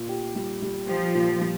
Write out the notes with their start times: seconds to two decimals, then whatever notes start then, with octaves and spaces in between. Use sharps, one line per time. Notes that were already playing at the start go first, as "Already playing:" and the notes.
Already playing: A#2
0.09 G4
0.35 G3
0.62 G3
0.87 F3 G4
1.15 A#2
1.40 G3